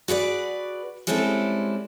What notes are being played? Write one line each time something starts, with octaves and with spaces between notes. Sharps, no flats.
F#4 G#4 B4 D5
G3 G#3 C4 C#4 E4 A4